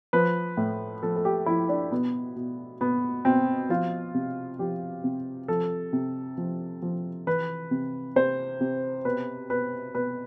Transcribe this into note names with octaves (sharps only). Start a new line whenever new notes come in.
F3 B4
A2
F3 A4
A4
G4
F3 E4
D4
B2 B3
B2
B2 B3
B2 C4
F3 F4
C3
F3 G4
C3
F3 A4
C3
F3
F3
E3 B4
C3
C3 C5
C3
B2 B4
B2 B4
B2 B4